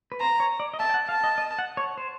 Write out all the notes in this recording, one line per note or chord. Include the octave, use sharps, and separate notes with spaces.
B4
C5 A#5
C#5
D5
D#5
E5 A5
G5
F#5
F5 A5
D#5
D#5
F#5
C#5
C5